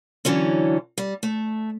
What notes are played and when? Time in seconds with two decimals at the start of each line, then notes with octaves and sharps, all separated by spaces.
0.25 D3 E3 F#3 C#4
0.98 G3
1.23 A3